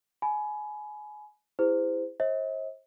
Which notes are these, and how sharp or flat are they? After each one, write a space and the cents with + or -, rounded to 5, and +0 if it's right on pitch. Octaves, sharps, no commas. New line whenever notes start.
G#5 +25 B5 +0
E4 +0 G#4 -40 C5 -30
C5 +40 D#5 +45